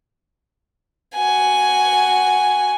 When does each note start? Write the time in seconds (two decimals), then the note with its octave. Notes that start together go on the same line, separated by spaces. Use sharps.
1.15 F#4 G#5